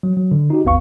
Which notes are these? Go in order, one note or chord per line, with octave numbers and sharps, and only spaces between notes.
F#3
F#3
D3
D#4 F#4 G4
G#1 D#2 B3 F5 C#6